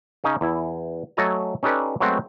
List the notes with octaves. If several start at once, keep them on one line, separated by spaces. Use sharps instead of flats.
C#3 C#4 D#4
E2 E4
F#3 A3 A4 D#5 G#5 A#5
C#4 D#4 G4 A4 B4 D5
F#3 G#3 A3 B3 C4 F#4